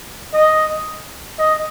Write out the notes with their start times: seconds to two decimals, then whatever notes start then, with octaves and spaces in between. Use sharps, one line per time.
0.34 D#5
1.39 D#5